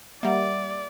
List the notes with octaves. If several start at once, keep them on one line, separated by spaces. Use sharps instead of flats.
G3 A#3 D5 E5 F#5